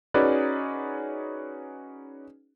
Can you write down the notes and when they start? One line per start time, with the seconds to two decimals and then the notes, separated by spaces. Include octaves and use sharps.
0.14 C#4 D#4 F#4 G#4 B4 D5